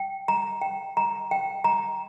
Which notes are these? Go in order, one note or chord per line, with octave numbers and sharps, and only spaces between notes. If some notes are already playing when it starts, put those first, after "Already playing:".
Already playing: G5
A#5
G5
A#5
G5
A#5